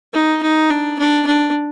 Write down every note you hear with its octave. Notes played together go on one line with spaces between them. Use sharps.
D#4
D#4
D4
D4
D4